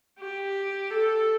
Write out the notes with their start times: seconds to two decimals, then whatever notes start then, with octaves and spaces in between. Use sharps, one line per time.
0.19 G4
0.90 A4